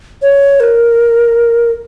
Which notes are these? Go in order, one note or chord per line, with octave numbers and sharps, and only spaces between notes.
C#5
A#4